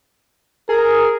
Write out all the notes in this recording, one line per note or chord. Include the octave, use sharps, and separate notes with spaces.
G#4 A#4